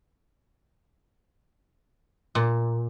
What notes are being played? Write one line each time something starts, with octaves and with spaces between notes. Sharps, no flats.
A#2